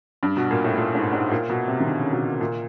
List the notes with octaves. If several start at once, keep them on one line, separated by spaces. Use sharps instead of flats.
G2
B2
A#2
A2
A#2
G#2
G#2
A#2
B2
C3
D#3
D3
C#3
B2
A#2